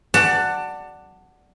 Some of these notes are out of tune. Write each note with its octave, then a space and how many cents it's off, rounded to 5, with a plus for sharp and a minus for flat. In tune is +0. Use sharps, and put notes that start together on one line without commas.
D5 +5 F#5 +5 A5 +25